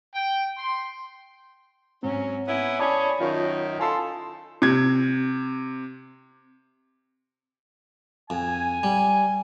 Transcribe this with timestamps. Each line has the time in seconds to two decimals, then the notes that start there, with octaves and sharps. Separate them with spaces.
0.14 G5
0.57 C6
2.03 G#2 F#3 C4 C#4
2.48 B3 C#4 E4
2.79 C#4 G#4 C#5 D5 A5 B5
3.20 F#2 D#3 F4 C#5
3.80 E4 F4 A4 G#5 A5 C6
4.62 C3 G#6
8.30 F2 G#5
8.83 G3